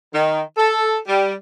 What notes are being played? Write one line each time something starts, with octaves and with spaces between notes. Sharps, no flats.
D#3
A4
G3